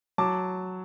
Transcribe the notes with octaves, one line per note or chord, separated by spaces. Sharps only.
F#3 A5 D6